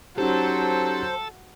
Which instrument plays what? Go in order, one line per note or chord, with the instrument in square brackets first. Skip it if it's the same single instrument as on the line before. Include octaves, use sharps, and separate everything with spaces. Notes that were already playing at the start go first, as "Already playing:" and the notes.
[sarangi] F#3 [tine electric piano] C#4 D#4 G4 [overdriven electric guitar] A4 [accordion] C5